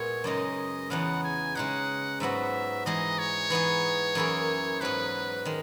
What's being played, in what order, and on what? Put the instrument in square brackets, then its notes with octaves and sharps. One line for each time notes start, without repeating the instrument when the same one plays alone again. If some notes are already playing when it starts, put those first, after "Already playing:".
Already playing: [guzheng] A#2 G#3 B3 E4 [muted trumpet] C#5
[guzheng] F#2 C#3 G#3 D#4 [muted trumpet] D#5
[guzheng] E2 C#3 E3 B3 D#4 [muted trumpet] F#5
[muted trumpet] G#5
[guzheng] C#3 G#3 D#4 G#4 [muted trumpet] F#5
[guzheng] G#2 F#3 B3 F#4 [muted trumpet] E5
[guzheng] E3 G#3 D#4 G#4 [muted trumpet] D#5
[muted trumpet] C#5
[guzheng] E3 B3 D#4 G#4
F#2 E3 A#3 E4 G#4
[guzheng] G#2 F#3 B3 [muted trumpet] B4
[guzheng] D#3 G#3